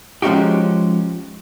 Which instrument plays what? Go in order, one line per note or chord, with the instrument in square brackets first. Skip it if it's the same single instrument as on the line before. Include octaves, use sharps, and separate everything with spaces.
[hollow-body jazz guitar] F3 G#3 C#4 D#4 F#4 G4